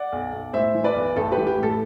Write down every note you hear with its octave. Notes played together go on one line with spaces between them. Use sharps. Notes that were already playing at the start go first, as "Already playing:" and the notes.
Already playing: D5 F#5
B1
B1
A2 C5 E5
E3
B4 D5
B1
A1 A4
G4 B4
E3
G4
A2 A4